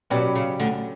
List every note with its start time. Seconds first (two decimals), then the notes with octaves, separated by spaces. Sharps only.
0.10 B2 F#3 C#4 G4 D5
0.35 C#3
0.60 D2 D3